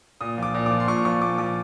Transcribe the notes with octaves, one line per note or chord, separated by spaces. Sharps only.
A#2 D#6
F3 D6
A#2
D6
F3
C6
A#2 C#6
F3 C#6
A#2 D6
F3 D6